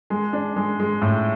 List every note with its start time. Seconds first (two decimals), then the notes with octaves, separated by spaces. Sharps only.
0.10 G#3
0.33 D4
0.56 G#3
0.80 G#3
1.02 A2